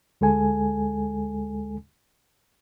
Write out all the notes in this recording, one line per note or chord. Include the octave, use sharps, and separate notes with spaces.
D2 G#3 A4 G#5